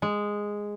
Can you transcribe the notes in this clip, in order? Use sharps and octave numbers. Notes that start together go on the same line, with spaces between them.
G#3